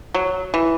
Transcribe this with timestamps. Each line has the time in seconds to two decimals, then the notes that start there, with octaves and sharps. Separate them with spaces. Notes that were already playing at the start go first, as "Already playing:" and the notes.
0.14 F#3
0.54 E3